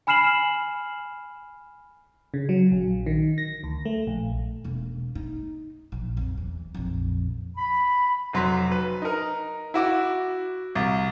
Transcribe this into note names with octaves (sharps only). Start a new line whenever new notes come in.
G#5 B5 F6 C7 E7 F#7
C#3
F#3
A#1
D#3
A#6
D2
A3
A#1
E1 A#3
D#4
A#1
F2
E2
A#1 F2
B5
F1 F#3 C6 B6
B4
D#4 A#4
E4 F#4 D6
C2